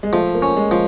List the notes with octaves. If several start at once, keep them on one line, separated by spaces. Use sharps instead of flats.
G#3
F3 A3
A#3
C#4
G#3
F3